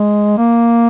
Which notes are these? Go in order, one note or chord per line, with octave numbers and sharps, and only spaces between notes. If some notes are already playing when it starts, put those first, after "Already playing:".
Already playing: G#3
A#3